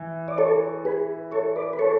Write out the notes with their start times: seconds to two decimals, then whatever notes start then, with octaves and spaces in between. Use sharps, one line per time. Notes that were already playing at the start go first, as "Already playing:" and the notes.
Already playing: E3
0.28 D5
0.38 A4 C#5
0.85 G#4 B4
1.32 A4 C#5
1.56 B4 D5
1.73 B4
1.79 A4 C#5